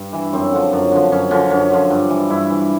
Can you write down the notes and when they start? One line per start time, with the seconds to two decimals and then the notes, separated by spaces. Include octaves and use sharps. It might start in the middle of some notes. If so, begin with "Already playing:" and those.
Already playing: G2
0.13 E3
0.33 F#2 C4
0.53 D3 F3
0.73 F#2
0.91 D3 F3
1.12 F#2 C#4
1.31 D3 F3 C#4
1.51 F#2 C#4
1.71 D3 F3
1.90 G2
2.09 E3
2.30 G2 E4
2.50 E3